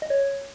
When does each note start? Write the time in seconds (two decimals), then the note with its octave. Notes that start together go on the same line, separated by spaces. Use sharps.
0.02 D#5
0.10 C#5